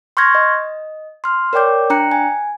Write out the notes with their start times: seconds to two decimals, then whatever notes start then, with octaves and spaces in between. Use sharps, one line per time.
0.17 C6 C#6 F6 G6 G#6 A#6
0.35 D#5
1.24 C6 F6
1.53 A#4 C#5 D5 G5 D6 G6
1.90 D4 G5 A#5 F#6 C#7
2.11 G#5